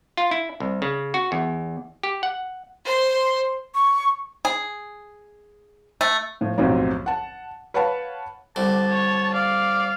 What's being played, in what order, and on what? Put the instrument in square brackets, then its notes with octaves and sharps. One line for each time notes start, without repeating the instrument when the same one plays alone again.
[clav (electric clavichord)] F4
E4
C2
C#3
F#4
E2
G4
F#5
[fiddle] C5 C6
[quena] C#6
[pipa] G#4
A3
[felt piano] A2 F3
B1 F#2 A2 C3 F3 F#3
F#5 A5
B4 C#5 F5 F#5 A5 B5
[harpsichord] C2 D3 [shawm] A5
[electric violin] C#5
[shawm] D5 [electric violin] F5